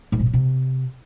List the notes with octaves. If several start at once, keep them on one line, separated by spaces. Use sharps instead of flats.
G#2
B2
F#3
C3